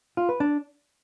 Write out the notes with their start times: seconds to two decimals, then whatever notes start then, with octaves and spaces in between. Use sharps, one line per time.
0.17 F4
0.29 B4
0.40 D4